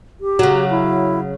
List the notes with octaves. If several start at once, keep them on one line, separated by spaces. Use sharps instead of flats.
G4
C#3 F#3
E4